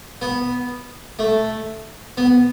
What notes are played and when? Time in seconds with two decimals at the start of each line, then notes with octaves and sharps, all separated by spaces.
0.22 B3
1.19 A3
2.17 B3